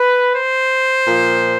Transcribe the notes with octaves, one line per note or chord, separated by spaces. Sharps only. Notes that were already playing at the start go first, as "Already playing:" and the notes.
Already playing: B4
C5
A#2 F3